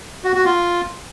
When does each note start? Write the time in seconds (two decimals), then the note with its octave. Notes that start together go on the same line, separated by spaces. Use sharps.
0.24 F#4
0.35 F#4
0.45 F4